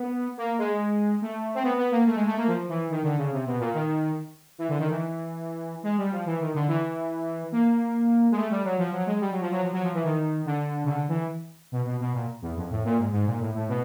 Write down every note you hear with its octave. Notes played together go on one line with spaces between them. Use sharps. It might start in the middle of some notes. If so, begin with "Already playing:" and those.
Already playing: B3
A#3
G#3
A3
C4
B3
B3
A#3
A3
G#3
A3
A#3
F3
E3
D#3
D3
C#3
C3
B2
A#2
D#3
E3
D3
D#3
E3
G#3
G3
F3
E3
D#3
D3
E3
A#3
G#3
A3
G3
F#3
F3
F#3
G#3
G3
F#3
F3
F#3
F3
F#3
F3
E3
D#3
D3
C#3
D3
E3
B2
B2
B2
A#2
E2
F2
A2
A#2
G#2
G#2
A#2
A2
A2
B2